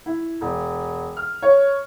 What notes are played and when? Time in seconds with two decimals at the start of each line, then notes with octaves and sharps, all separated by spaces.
0.06 E4
0.41 E1
1.17 F6
1.42 C#5